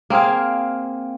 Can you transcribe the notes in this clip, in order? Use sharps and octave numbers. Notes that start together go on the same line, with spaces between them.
A#3 C4 G#4 F5